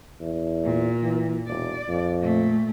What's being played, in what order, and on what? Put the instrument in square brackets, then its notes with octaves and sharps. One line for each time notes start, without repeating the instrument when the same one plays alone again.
[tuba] E2
[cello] A#2
[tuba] E3
[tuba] E1 [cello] D5
[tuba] F2
[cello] A#2 A3